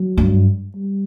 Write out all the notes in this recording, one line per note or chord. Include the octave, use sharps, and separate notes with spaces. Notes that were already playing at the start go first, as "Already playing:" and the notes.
Already playing: F#3
G2
G3